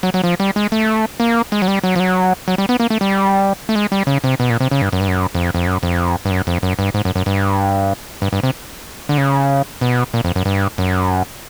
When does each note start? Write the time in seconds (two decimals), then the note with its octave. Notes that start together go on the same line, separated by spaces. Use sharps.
0.03 F#3
0.14 F#3
0.24 F3
0.40 G3
0.56 G#3
0.72 A3
1.20 A#3
1.52 G#3
1.62 F#3
1.68 G3
1.84 F#3
1.96 F3
2.00 F#3
2.48 F#3
2.58 G3
2.69 B3
2.80 A#3
2.90 A3
3.01 G3
3.69 A3
3.75 G#3
3.92 G3
4.07 C#3
4.24 C3
4.40 B2
4.50 A#2
4.60 C3
4.71 C#3
4.82 G2
4.93 F#2
5.00 G2
5.08 F#2
5.35 F2
5.55 F2
5.67 F#2
5.83 F2
6.25 G2
6.31 F#2
6.47 F2
6.63 F#2
6.79 G2
6.94 G#2
7.05 F#2
7.16 F#2
7.26 G2
8.22 G2
8.33 G2
8.43 C3
9.09 D3
9.18 C#3
9.81 B2
10.14 A#2
10.25 F2
10.36 F#2
10.45 G2
10.78 F#2